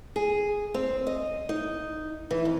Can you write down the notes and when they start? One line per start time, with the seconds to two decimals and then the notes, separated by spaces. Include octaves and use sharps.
0.16 G#4
0.74 C4
1.07 D#5
1.49 D#4
2.31 E3
2.45 F2